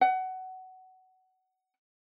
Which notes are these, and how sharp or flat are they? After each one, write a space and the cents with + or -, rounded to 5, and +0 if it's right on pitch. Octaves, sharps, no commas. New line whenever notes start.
F#5 +20